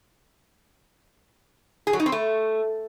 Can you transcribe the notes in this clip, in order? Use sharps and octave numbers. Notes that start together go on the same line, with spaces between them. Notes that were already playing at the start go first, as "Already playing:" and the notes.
G#4
F#3
D#4
C4
A3